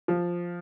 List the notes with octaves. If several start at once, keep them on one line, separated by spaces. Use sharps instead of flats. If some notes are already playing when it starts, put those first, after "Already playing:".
F3